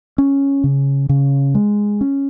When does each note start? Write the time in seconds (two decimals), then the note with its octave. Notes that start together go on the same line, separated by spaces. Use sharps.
0.18 C#4
0.64 C#3
1.09 C#3
1.55 G#3
2.01 C#4